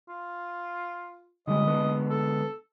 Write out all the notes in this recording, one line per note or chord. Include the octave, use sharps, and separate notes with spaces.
F4
D3 G3 G#3 D#5
D3 G#3 B3
A4